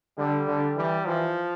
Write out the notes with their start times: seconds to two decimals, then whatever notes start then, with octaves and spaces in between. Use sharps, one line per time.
0.18 D3 G3
0.48 D3
0.77 E3 G3
1.06 E3 F3